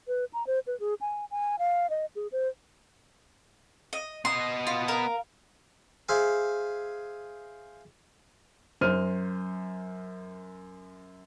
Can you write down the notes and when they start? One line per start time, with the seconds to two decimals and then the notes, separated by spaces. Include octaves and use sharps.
0.08 B4
0.34 A#5
0.47 C5
0.67 B4
0.80 G#4
1.01 G#5
1.31 G#5
1.59 F5
1.90 D#5
2.16 G#4
2.32 C5
3.93 D#5
4.25 B3 D#5 C6
4.67 F4
4.88 A#4 F5
6.09 G#4 C5 E5 F5 G#5
8.81 F#2 C5 F6 D#7